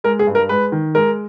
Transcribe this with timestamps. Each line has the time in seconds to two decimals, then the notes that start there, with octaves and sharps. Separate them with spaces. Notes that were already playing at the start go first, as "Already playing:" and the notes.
0.04 G#3 A#4
0.19 G#4
0.27 G2
0.35 A#4
0.49 G#3 B4
0.72 D#3
0.95 G#3 A#4